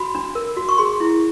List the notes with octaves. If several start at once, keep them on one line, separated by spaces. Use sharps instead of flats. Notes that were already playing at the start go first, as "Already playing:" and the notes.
Already playing: F#4 B5
D4
A#4
F#4
C#6
G#4 C6
E4